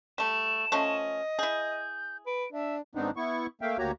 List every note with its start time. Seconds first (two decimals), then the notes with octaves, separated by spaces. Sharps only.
0.18 G3 A3 E7
0.72 F3 A3 C#4 D#5
1.39 E4 G#4 G6
2.27 B4 D7
2.53 D4 E5
2.95 G#2 D#3 B3 C4 D4 D#4
3.17 B3 E4 C#6
3.61 A3 A#3 E5 F5 G5
3.78 D2 A#3 F#4 G4 C#5 A#5